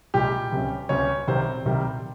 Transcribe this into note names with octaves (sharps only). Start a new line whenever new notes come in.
C2 A#2 G3 G#3 G4
C#2 C3 G3 C#4
C#2 C3 G3 C#4 C#5
C2 C3 D#3 G3 C4 C5
C2 C3 D#3 G3